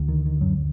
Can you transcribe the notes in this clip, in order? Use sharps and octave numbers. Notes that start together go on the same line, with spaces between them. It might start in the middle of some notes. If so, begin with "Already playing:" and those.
Already playing: D2 D3
D#3
D#3
F#2 F#3